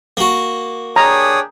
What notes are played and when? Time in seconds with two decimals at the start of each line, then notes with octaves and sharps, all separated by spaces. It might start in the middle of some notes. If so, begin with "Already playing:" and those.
0.17 A#3 F#4
0.96 D4 G4 G#4 C#5 A#5 D#6